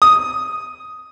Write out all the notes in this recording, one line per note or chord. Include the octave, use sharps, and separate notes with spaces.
D#6